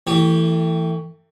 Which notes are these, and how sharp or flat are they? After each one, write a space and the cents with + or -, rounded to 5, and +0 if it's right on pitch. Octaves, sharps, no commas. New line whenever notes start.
E3 +0 A3 +30 G4 +0